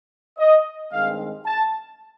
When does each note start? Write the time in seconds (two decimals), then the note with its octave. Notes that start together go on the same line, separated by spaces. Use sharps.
0.39 D#5
0.93 G2 D#3 G#3 C4 F5
1.46 A5